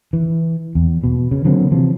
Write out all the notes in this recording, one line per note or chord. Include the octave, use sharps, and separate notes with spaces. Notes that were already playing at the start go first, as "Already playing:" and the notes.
E3
E2
B2
C#3
D3 F#3 A#3 C4
C3 E3 F3